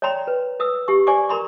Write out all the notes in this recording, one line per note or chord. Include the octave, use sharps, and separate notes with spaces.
C#5 D5 G5 A#5 C6
B4
B4 D#6 E6
G4 C#6
C5 D5 G#5 C#6 D6
A#4 A#5 C6 C#6